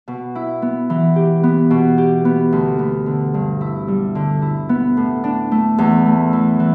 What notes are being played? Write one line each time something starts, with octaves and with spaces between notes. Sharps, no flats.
B2
E4
B3
E3
G4
B3
B2
G4
B3
D2
B3
D3
G2
E4
G3
D3
E4
B3
A2
D4
A3
E2
A3
E3
E3